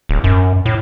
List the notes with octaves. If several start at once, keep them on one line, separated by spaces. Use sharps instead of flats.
D1
F#2
A2